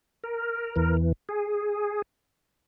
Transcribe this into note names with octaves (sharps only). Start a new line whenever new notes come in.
A#4
E2 E3
G#4